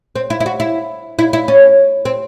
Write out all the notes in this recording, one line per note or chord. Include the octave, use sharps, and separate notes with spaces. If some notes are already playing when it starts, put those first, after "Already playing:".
C4
E4
E4
F#4
E4
E4
E4
C#4
C4